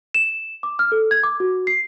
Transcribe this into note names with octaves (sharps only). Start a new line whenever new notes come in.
E7
D6
F6
A4
G#6
D6
F#4
C7